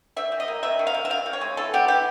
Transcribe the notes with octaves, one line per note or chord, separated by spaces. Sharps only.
G3 E5
G3
D#5
A#3
C3 E5
D#3
F5
C3
E5
C3 F5
C3
C#5
G#3
E3 A4
B3 G4
E3 G4